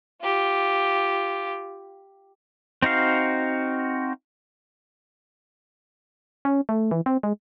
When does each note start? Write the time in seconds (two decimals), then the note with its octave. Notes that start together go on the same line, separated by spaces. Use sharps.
0.22 F4 G4
2.82 C4 D#4 F#4 F5
6.45 C#4
6.69 A3
6.91 E3
7.06 C4
7.23 G#3